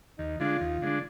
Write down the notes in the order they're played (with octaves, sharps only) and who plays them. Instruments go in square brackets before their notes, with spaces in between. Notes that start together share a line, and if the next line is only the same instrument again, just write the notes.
[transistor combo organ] D#2 [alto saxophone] D#4
[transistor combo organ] D3 G#3 D4 [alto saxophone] F4
[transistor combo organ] D#2
D3 G#3 D4